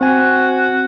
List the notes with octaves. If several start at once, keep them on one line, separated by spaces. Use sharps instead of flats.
C4 F#4 G#5